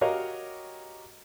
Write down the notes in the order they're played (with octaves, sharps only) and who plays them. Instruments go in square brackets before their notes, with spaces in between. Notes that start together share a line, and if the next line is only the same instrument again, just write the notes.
[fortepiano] F#4 G4 A#4 C#5 D#5 F5